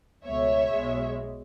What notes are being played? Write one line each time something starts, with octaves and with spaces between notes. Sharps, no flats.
C#2 B2 A3 C#5 E5
B1 B2 G#3